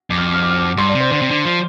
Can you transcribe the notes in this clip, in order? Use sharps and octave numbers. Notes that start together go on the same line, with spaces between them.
F2 D6
F6
D6
F6
D6
F6
D6
G2 C6
D5
C3
C5
D3 C5
C3
D3
F3